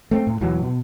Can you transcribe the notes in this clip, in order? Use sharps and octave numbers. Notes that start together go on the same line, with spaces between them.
A3 C4
A2
E1 E3 F#3
B2